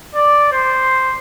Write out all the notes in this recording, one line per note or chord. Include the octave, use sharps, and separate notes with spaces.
D5
C5